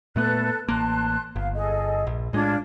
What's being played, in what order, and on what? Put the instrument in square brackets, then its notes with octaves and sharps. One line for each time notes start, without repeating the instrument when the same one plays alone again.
[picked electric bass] A#2 A3 B3 [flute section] A4 B4 F#6
[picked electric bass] A1 A#3 [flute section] A5 C6 F#6
[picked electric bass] G1 [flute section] F5
[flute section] G#4 A4 D#5
[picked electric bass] A#1
[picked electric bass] A2 G#3 [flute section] D4 F4 G#6